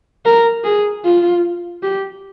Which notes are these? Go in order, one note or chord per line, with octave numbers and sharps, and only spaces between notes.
A#4
G#4
F4
G4